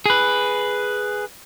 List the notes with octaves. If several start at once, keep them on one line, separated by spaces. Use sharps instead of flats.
G#4 B4